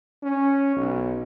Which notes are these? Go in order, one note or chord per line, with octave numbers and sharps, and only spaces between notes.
C#4
B1